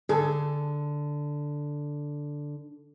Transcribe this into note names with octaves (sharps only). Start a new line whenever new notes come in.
D3 G#4 A4